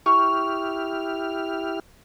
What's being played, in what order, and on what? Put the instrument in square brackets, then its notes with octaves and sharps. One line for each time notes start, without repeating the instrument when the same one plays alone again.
[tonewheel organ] E4 G4 F6 [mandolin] C#6